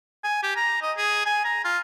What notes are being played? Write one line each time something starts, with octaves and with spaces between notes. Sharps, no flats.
G#5
G4
A#5
D#5
G#4
G#5
A#5
F4